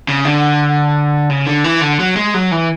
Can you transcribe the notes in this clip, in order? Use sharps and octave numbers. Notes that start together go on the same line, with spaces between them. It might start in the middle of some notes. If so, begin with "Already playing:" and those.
C#3
D3
C#3
D3
E3
D3
F#3
G#3
F#3
E3